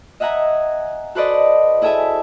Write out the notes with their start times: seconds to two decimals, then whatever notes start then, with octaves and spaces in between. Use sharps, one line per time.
0.20 D#5 E5 F#5 G#5 A#5
1.15 F#4 A4 B4 C5 D5 D#5
1.82 E4 G#4 A4 E5 G#5 A5